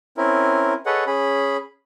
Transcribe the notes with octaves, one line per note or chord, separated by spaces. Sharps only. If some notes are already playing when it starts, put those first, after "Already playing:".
C4 C#4 E4 A#4
G#4 A4 B4 C#5 D#5 F#5
C#4 G#4 B5